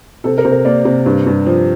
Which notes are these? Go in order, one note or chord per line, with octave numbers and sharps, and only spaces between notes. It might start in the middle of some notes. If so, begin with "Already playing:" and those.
C3 A4
A#4
C3
A#4
A#3 D5
C3
G2
G2
F3